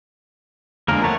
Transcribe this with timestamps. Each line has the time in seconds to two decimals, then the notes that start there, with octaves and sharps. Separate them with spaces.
0.88 F2 D3 G#3 A#3 A#4
1.04 A3 A#4 C#5 F#5 A5